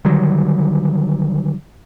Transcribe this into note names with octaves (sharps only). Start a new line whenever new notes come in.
D3 D#3 F#3 G3